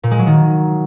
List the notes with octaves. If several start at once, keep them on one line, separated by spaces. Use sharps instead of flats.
A#2
G#3
F#3
D#3